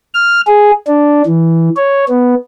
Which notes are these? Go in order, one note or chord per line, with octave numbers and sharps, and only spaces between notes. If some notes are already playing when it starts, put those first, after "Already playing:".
F6
G#4
D4
E3
C#5
B3